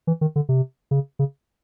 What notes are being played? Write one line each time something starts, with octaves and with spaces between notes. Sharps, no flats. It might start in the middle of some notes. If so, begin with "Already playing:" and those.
E3
D#3
D3
C3
C#3
C#3